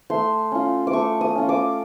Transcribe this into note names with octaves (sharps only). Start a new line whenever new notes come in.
A3 C6
C#4 F4
D6
A3 C#6
D#6
C#4 F4
D6